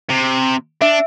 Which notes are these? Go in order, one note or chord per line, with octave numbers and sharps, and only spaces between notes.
C3
D4 E5